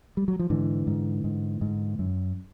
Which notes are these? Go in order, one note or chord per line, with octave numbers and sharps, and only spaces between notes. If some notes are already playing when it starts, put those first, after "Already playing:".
G3
F#3
F3
G#2 D3 E3
G#2
G#2
G#2
F#2